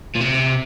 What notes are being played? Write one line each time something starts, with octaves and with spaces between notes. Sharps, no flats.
A#2
C3